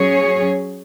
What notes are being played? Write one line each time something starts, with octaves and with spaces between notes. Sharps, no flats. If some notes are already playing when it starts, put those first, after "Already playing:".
Already playing: F#3 C#4 G#4 C#5